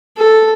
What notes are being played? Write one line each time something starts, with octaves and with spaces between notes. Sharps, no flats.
A4